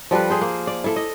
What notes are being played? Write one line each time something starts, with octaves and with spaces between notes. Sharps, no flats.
F3 G3 A4 B4
G#4 C5
A#3
D5
E4 A4
D#5